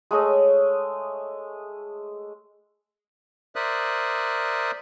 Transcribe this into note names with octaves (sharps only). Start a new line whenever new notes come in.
G#3 A3 C#5 D#5
A#4 C5 D5 E5 D#6 F#6